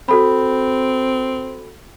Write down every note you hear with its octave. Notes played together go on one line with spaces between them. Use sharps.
C4 F#4 A4 B5